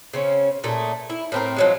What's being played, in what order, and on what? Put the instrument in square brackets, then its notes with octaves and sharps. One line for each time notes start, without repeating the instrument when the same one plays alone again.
[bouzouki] C#3 C4 C#4
A#2 A3 G#4
E4
A2 C4 A#4
F3 F#3 G#3